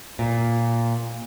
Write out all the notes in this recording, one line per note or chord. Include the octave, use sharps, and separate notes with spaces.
A#2